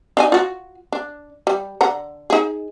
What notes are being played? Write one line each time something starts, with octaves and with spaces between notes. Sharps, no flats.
D4 D#4 G#5
F4 F#4
D4
G3
D3 F#5 A#5
D#4 G#4